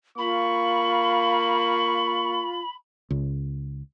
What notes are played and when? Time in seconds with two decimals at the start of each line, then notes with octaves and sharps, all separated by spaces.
0.18 A#3 F4 B5 C#6
3.10 C#2